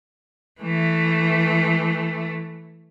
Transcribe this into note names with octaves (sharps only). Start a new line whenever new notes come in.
E3 A3